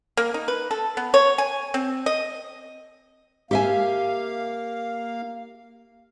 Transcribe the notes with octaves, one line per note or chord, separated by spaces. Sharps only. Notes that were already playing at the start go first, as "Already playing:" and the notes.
A#3
D#4
B4
A4
B3
C#5
G#5
C4
D#5
A#3 G4 E5 F5 G#5